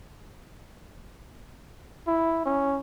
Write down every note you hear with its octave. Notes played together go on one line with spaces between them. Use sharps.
E4
C#4